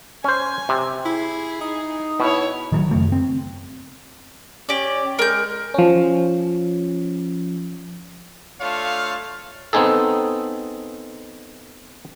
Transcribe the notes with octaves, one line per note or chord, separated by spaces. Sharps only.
C#4 C5 G#5
C3
E4 G#4
D#4
B2 E4 C#5
D#3 F3 F#3
F#2 C#3 A3
C4
C#4 G4 D5
G#3 A#4 G6
F3 C#4
A3 D4 F4 C#5 F5
B3 C4 D#4 G#4 A4